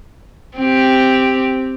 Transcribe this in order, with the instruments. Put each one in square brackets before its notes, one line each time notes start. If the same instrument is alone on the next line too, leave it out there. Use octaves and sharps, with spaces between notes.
[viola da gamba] C4 G4